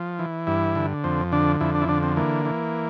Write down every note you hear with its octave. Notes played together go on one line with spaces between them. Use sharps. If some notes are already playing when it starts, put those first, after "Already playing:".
Already playing: F3
E3
G2 E4
D3
F2 C4
D3 D4
F2 E4
D4
E4
D3 D4
C4
E3 A#3
E3